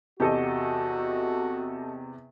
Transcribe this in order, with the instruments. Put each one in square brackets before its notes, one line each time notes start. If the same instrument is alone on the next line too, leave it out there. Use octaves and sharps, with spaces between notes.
[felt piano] E2 C3 [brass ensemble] F#4 [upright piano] G4 A4 D#5